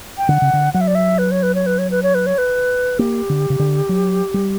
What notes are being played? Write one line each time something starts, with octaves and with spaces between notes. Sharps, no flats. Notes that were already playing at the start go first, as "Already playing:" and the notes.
G5
D3 F#5
C#3
D3
F#3 F#5
E5
D5
E5
B4
C#5
B4
C#5
B4
C#5
B4
C#5
B4
C#5
B4
A#3 G4
D3
C#3
D3
F#3
G3